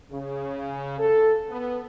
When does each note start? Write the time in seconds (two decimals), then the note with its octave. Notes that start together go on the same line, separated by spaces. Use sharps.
0.11 C#3
0.99 A4
1.49 B3